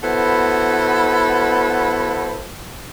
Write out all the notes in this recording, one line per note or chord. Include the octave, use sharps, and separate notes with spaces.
B3 E4 F#4 A4 B4 C5